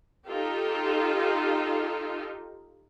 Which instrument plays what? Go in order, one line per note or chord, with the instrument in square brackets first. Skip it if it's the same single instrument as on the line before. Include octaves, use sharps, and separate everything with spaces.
[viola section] D#4 F4 G4 A4